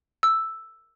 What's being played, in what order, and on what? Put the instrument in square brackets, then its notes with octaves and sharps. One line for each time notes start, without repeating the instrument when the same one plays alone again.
[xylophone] E6